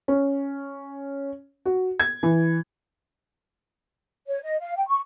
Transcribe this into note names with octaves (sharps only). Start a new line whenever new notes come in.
C#4
F#4
G#6
E3
C#5
D#5
F5
G5
C#6